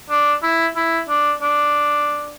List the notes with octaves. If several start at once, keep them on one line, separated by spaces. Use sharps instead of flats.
D4
E4
E4
D4
D4